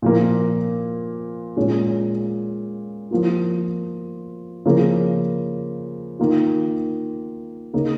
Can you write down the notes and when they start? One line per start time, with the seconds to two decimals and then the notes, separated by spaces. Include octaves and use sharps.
0.02 A#2 F3 A#3
1.57 A#2 G#3 C#4 F4
3.11 F3 A#3 F4
4.66 C#3 F3 A#3
6.19 D#3 A#3 F4
7.73 C#3 A#3 D#4